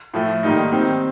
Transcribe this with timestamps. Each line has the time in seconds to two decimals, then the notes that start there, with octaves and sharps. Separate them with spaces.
0.14 A2 F3 A3
0.43 G#2 D#3 G3 A#3 D#4
0.72 D#3 G3 C4 D#4